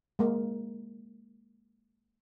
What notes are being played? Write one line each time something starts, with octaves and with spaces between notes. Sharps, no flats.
G#3 A#3 A#4